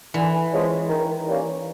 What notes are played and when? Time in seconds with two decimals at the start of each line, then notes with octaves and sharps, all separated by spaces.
0.14 D3 E3
0.52 F3 G#3 C#4
0.89 D#3
1.26 G3 A#3 C#4